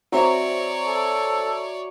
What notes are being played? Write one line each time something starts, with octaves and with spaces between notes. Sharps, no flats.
F#3 C4 C#5 D5 E5
A4